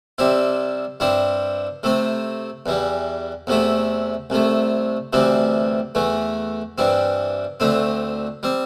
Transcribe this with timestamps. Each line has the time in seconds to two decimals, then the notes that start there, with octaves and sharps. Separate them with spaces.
0.18 C3 G3 C4 E4
1.00 G2 G3 C4 E4
1.83 C3 A3 C4
2.66 E2 E3 G3
3.47 E2 C3 A3 E4
4.30 C2 C3 A3
5.13 D2 C3 E3 G3 C4
5.95 E2 E3 A3
6.78 G2 E3 G3 C4
7.60 D2 D3 A3 C4
8.43 G3 C4